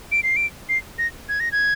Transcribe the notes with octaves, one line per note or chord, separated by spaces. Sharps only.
D7
C7
D7
C7
A#6
G#6
A#6
G#6